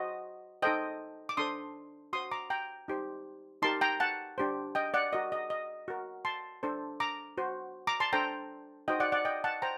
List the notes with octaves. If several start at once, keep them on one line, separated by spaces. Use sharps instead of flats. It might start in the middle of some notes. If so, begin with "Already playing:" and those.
Already playing: F#4 C5 D#5
D#4 A4 C5 D#5 G5
D6
D4 A4 C5 C6 D#6
F#4 C5 C6 D#6
A#5 D6
G5 A#5
D#4 G4 C5
D#4 G4 A#4 A5 C6
G5 A#5
F#5 A5
D4 G4 C5
D#5 G5
D5 F#5
F#4 A#4 D#5
D#5
D#5
F#4 A#4
A5 C6
D4 A4 C5
A#5 D6
F#4 C5
A#5 D6
A5 C6
D4 A4 C5 G5 A#5
D#4 F#4 C5 D#5 G5
D5 F#5
D5 F#5
D#5 G5
F#5 A5
C5 G5 A#5